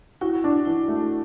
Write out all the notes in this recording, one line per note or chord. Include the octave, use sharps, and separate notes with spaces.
E4 F#4
D4
E3 E4
A3